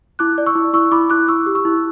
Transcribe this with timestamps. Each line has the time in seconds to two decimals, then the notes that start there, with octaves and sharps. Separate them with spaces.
0.19 E4 D6 F#6
0.38 D5
0.46 C#6 E6
0.55 E4
0.73 E4 C#6 E6
0.91 E4 B5 D6
1.10 E4 D6 F#6
1.28 E4 C#6 E6
1.46 G4
1.55 C#6 E6
1.65 E4